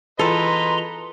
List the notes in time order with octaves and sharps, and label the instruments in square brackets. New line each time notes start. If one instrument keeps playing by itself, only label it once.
[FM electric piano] E3 F4 G#4 [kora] A4 [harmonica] B4 D#5 [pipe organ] A#5 C6